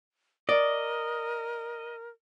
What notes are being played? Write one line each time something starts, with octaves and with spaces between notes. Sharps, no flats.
A#4 D5 D#5